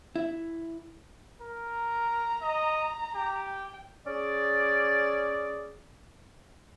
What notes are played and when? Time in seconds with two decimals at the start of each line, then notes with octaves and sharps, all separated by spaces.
0.16 E4
1.41 A#4
1.73 A#5
2.42 D#5
3.15 G4 A#5
3.47 G5
4.07 C#4 G#4 D5